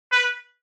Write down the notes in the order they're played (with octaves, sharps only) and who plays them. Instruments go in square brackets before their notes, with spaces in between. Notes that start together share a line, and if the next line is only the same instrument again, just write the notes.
[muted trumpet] B4